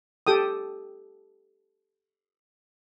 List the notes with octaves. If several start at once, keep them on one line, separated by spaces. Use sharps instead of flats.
G4 A4 G5 D#6